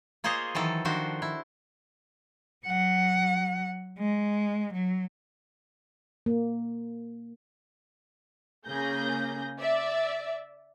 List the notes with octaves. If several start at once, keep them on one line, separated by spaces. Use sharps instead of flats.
A#3 F4 G#4 C5 C#5 D#5
D#3 E3 F#3 A4
D#3 F3 D4 F#4 C5
E4
F#3 F#5
G#3
F#3
A#3
C#3 A#3 G#4 G6 A#6
D5 E5